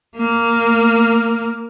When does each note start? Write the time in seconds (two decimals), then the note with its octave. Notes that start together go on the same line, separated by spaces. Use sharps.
0.17 A#3